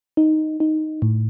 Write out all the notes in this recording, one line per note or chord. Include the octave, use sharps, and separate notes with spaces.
D#4
D#4
A2